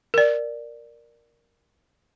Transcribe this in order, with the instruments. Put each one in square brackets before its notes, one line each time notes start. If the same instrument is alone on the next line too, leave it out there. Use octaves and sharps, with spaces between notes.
[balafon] A#4 D5